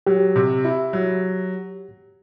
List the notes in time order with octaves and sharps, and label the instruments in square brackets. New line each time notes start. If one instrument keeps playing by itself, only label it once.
[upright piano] F#3 [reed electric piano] G4
[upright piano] C3
E4
F#3